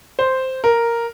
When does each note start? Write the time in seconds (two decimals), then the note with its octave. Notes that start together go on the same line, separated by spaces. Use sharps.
0.19 C5
0.64 A#4